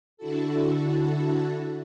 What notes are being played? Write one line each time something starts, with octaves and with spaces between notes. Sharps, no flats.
D3 D4 E4 F#4 A4